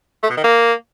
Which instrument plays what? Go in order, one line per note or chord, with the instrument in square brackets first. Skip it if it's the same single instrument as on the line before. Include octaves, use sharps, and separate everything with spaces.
[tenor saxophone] A3
B2
D#3
A#3